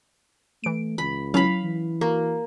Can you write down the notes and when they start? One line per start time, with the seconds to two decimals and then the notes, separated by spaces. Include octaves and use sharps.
0.64 E3 A3 D7
0.98 C#2 B5
1.34 F#3 C#4 E4 F5 B5
1.63 E3
2.01 A#3 F#4